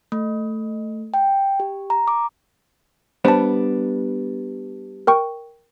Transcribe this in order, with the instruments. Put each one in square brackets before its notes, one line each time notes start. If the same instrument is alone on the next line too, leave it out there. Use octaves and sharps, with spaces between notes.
[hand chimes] A3
G5
G4
A#5
D6
[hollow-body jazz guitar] G3 B3 D4 [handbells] C5 A5
[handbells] A#4 G5 C#6